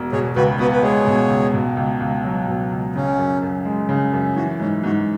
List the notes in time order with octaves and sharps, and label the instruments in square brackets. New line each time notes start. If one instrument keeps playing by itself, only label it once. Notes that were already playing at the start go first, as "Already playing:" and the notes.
Already playing: [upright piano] E1
[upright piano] B2 [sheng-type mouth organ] G#4 C#5
[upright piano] C#2 [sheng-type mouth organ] F#4 B4
[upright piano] B3 [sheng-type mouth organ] F#4 B4
[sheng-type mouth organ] B4
[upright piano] G#3 [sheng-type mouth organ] G#4 C#5
[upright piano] B2
C#2
B2
C#2
C#2
F#3
B2
C#2
[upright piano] C#3 [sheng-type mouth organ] C#4
[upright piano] F#2
F#2
G#3
C#3
F#2
[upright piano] E3 [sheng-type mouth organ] F#4
[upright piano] G#2 [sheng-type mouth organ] C#4
[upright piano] G#2 [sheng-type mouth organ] F#4